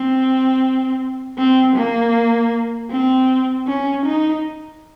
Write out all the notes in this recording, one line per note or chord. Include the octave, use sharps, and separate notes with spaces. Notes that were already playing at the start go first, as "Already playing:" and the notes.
Already playing: C4
C4
A#3
C4
C#4
D#4